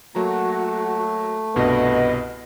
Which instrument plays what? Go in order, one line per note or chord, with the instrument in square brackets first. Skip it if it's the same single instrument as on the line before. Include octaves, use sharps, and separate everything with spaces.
[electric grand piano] F#3 A#3 A#5 [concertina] A3 [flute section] F#4
[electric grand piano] C2 G2 B2 [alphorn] B3 [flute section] D#5